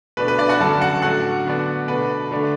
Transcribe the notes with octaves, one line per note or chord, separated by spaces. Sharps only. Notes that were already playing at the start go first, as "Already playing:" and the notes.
B2 A3 D4 B4
B4
D4 D5
F#4 F#5
F#2 D3 A3 D4 A4 A5
F#4 F#5
A2 F#3 A3 D4 F#4 F#5
D3 B3 D4
B2 A3 D4 B4
D3 A3 D4